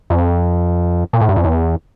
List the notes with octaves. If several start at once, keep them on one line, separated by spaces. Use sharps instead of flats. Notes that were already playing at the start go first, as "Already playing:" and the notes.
F2
A#2
A2
G2
F2
E2